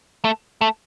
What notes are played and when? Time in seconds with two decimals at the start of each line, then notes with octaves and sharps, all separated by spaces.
0.25 A3
0.61 A3